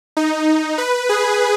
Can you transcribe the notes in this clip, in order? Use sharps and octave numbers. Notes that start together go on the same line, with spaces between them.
D#4
B4
G#4